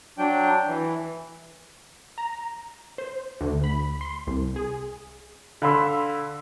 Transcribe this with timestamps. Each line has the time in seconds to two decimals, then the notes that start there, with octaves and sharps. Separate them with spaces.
0.18 F#3 D4 G5
0.68 E3
2.18 A#5
2.98 C5
3.41 D2
3.64 B5
4.01 C6
4.27 C2
4.56 G#4
5.62 D3 F5 B5 C6 E6